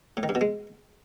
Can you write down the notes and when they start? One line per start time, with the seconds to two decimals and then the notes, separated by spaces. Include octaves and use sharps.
0.17 A2
0.23 D#3
0.29 G2
0.35 B2
0.41 G#3